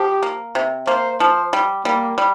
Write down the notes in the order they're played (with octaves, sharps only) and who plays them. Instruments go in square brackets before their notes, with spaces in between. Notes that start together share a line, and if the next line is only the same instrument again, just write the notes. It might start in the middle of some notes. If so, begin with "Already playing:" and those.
Already playing: [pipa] F3 [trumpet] G4
[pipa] A#3
C3
[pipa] A#3 [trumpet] C5
[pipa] F3 [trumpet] C5
[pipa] G3
[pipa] G3 [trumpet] A#3
[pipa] G3